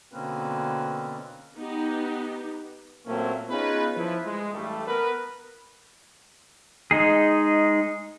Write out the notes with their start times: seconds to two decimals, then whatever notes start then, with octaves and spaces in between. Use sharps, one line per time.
0.12 B2 D3 A#3 C4 C#4 B4
1.58 B3 D#4 G4
3.06 A#2 F#3 A3 A#3 C4 C#4
3.49 B3 C#4 D#4 F4 G#4 B4
3.96 F3 E4 B4
4.25 G#3
4.53 A1 G2 G3 A3
4.87 B3 A#4 B4
6.91 G#3 D#4 G#4